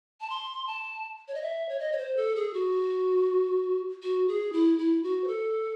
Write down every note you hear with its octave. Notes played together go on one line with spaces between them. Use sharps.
A5
C6
A5
C#5
D#5
E5
C#5
D#5
C#5
C5
A4
G#4
F#4
F#4
G#4
E4
E4
F#4
C5
A4